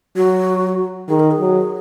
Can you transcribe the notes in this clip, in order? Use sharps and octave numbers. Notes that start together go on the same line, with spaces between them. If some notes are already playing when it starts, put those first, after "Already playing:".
F#3 F#4
D#3 G#4
A#4
G#4
F#3